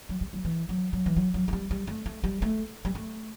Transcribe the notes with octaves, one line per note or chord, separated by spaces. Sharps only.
F#3
G3
F#3
E3
F#3
F#3
E3
F#3
F#3
A3
G3
G3
A3
A3
G3
A3
G3
A3